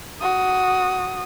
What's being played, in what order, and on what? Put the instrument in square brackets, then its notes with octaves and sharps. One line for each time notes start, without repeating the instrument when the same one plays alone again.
[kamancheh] F#4 D#6